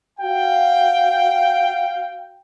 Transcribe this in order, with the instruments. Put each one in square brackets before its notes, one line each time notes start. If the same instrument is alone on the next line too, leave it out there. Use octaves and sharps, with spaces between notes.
[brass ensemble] F#4 F5 G5